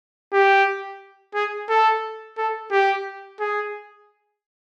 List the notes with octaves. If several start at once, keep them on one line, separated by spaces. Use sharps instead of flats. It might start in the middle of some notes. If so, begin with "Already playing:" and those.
G4
G#4
A4
A4
G4
G#4